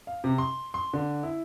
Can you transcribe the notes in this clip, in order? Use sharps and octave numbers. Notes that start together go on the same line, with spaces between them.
F5
C3
C6
C6
D3
E4